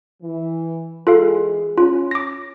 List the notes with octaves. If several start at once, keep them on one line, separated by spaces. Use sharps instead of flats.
E3
E3 G#3 F4 G#4 A4 F5
C#4 F4
D6 A#6